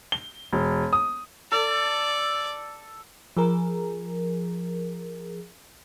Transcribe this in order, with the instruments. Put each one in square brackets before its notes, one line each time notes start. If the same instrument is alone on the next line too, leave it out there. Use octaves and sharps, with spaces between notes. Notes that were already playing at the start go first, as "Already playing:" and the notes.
[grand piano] G7
E1
D#6
[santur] A4 [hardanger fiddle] D5
[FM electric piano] F3 G#4 A#4